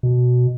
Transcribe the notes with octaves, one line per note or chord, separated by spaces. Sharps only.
B2